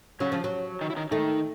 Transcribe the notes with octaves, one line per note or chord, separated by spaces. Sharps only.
C#3 F#3 C#4
F3
F#3
D#3 D#4
E4
D#3 D#4
D#3 A3 D#4